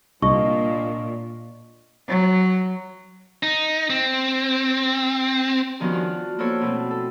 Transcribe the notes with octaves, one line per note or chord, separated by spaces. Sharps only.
C2 A#2 D4 D#5 C#6
F#3
D#4
C4
G2 D#3 F3 B3 C#4 F#4
D4 F4 F#4
A#3 B3 E4 A4 C5 C#5
B2 A3 C4
A4